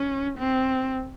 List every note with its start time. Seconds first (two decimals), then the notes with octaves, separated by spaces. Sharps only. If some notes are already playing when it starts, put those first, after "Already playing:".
Already playing: C#4
0.38 C4